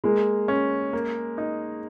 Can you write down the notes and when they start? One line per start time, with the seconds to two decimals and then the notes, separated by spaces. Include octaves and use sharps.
0.04 G#3 A#3
0.48 C#4
0.93 A#3
1.38 D#4